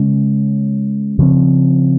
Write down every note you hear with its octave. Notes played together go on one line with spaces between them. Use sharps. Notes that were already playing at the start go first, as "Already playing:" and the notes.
Already playing: C#3 G#3 C#4
C#3 F3 C4